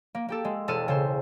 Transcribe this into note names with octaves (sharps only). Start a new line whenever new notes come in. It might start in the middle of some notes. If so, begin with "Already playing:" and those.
A#3
A#3 G4 A4
G#3
E1 A4 F6 D#7
C#3 A4 C5